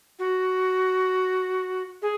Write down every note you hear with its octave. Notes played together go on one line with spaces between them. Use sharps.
F#4
G#4